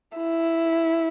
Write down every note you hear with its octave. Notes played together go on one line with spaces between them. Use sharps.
E4